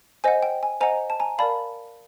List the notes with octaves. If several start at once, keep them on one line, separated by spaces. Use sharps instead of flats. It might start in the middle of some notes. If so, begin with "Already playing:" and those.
C5 D#5 F#5 G#5
G5
G#5
C5 D#5 F#5 G#5 A#5
A5
G#5 A#5
A#4 D5 F5 A5 B5